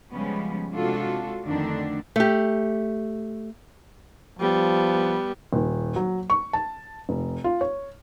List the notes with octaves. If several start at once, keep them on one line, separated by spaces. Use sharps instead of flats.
C#3 F3 G3 G#3 B3 C#4
C3 G#3 D4 F4 F#4 A4
F2 D3 D#3 A3 D4
A3 G4
F3 G3 B3
D#1
F#3
C#6
A5
F1
F4
C#5